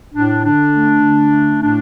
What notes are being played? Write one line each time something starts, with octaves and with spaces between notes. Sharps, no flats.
A2 D4
D3 D4
A3
D3
A3
A2 D4